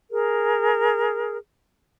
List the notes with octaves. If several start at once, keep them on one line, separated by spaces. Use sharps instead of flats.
G#4 A#4